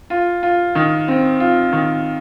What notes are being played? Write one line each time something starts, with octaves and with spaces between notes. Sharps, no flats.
F4
F4
D#3
C4
F4
D#3